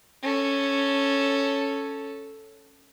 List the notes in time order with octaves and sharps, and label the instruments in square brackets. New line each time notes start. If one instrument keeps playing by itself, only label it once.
[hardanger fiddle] C#4 A4